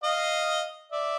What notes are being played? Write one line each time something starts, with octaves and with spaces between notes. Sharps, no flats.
D#5 F5
D5 E5